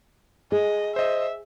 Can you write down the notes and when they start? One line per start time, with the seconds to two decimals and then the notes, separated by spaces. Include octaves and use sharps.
0.52 G#4 D#5
0.96 C5 D#5 E5